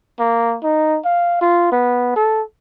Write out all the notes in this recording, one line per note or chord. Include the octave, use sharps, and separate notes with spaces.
A#3
D#4
F5
F4
B3
A4